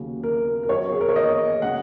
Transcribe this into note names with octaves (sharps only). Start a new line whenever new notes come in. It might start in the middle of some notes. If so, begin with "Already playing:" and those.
Already playing: D#2 C#3 F#3
A#4
A#4
F#2 F#3 C#5
G#4
A#4
C#5
D#5
C#3 G#3 F#5